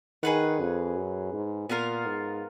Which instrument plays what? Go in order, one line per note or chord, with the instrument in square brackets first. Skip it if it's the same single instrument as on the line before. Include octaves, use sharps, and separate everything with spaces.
[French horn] D#3 [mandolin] G#4 B4 F#5
[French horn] F2
F#2
G#2
[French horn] A#2 [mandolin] B3 F4 A#4 F5
[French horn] G#2